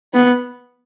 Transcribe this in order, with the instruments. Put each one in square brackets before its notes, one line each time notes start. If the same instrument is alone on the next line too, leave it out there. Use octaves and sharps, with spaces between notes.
[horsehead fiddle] B3